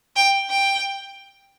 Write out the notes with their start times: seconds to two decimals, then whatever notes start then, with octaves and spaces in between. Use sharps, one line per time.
0.16 G5
0.50 G5